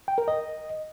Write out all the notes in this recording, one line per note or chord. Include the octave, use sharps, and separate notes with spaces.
G5
A#4
D#5